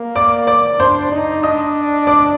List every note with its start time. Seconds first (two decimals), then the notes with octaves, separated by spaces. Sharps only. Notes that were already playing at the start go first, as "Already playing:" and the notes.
Already playing: A#3
0.15 D5 D6
0.47 D5 D6
0.79 D4 C5 C6
1.12 D#4
1.43 D4 D#5 D#6
2.07 D5 D6